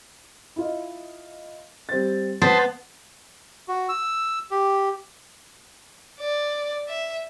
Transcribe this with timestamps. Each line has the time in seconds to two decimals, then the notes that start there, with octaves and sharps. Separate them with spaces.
0.56 E4 F4 D#5
1.89 G3 C4 A6
2.42 B3 C5 A5 D#6 B6
3.68 F#4
3.89 E6
4.51 G4
6.20 D5
6.89 E5